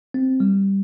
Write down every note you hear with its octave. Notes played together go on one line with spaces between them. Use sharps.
C4
G3